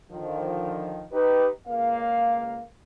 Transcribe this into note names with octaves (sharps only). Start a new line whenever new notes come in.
D3 D#3 F3
D#4 G4 B4
C#2 A#3 F5